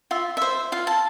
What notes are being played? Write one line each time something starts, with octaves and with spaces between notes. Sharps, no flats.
F4 E5
C5 E5
F4 F5
A5